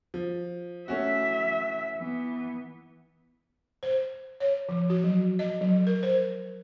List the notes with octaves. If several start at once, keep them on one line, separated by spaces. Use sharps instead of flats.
F3
E3 A3 C#4 F#4 E5
E3 B3
C5
C#5
F3
F#4
F#3
D#5
F#3
A#4
C5